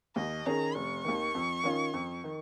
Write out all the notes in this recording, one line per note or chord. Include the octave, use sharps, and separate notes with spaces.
D#2 D#5
D#3 C#4 G#4 A#5
F1 C#6
D#2 D#3
F2
D#3 C#4 F4
F2
D#3